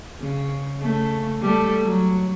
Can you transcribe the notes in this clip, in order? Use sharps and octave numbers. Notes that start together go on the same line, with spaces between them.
C#3
C#3 A3
G3 A3 A4
F#3